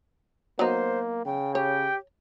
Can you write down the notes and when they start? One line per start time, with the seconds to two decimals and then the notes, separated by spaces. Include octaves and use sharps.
0.59 F#3 A#3 B3 D#4 C5
1.25 C#3 G5
1.55 G4 C#5 G5